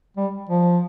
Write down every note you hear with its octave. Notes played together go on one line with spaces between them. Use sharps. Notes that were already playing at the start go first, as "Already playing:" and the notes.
G3
F3